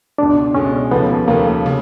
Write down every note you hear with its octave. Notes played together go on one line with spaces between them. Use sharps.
C#2 B2 G#3 D4
C#2 B2 G#3 C#4
D#2 C#3 F3 A3 B3
D#2 C#3 F3 A3 A#3
C#3